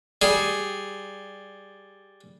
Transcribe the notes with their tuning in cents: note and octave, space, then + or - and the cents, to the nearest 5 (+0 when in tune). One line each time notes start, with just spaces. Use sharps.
G3 +0 G#4 +0